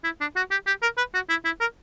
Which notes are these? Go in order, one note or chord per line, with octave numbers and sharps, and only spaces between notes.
E4
D4
F#4
G4
G4
A#4
B4
F#4
E4
E4
A#4